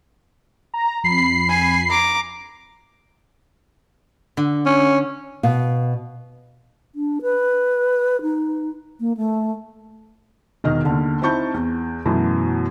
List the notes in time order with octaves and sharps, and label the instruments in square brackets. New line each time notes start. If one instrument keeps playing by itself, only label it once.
[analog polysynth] A#5
F2 B5 C7
[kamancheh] G#5
A#5 D6
[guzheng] D3
[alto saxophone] C#4
[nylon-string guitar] B2 F5
[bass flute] D4
B4
D#4
A#3
A3
[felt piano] E1 D#3 D#5 F6
D#2 D3
C4 D#4 E4 A5 C#6 G6
E2
F#2 B2 E3 F#3 A3